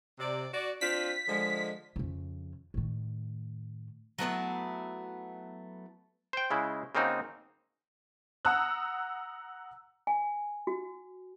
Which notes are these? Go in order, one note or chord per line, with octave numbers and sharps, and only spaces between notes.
C3 D5
F#4 D5
C4 D4 F4 B6
D3 F3 G#3
F2 C#3
A2 D#3
F#3 A3 B3 E4
C5 G5
C#3 G#3 E4
C#3 A#3 C4 D#4 F#4
F#5 A#5 D#6 E6 F#6
G#5
F#4